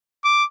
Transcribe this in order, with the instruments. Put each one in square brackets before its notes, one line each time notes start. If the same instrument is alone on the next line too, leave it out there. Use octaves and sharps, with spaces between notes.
[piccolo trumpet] D6